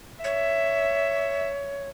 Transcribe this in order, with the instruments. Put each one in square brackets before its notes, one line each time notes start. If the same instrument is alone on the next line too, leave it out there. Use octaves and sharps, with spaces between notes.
[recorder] C#5 [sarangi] E5